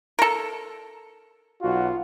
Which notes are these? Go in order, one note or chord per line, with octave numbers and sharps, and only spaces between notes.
A4 A#4
B1 F4 F#4